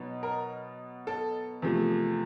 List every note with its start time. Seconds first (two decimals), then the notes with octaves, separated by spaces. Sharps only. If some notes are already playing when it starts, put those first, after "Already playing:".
Already playing: B2 F#3 B3 D#4
0.23 A#4
1.07 A4
1.62 E2 C3 F3 A3